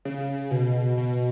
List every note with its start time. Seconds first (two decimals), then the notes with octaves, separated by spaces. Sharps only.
0.05 C#3
0.51 B2
0.97 B2